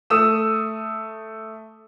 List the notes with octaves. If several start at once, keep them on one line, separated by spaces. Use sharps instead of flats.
A3 D#6 E6 E7